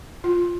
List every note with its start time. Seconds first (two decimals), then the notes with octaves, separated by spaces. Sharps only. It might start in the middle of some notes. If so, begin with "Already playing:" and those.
0.24 F4